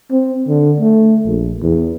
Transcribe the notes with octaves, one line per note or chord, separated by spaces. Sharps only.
C4
D3
A3
A#1
E2